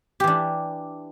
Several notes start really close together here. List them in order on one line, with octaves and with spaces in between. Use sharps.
G4 E3 D4